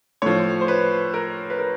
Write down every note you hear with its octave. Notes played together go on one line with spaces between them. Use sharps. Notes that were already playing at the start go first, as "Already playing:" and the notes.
A2 F3 C#5
C5
B4
A#4
B4
A#4